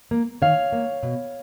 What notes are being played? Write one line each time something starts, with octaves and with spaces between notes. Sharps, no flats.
A#3
D#3 C#5 F5
A#3
B2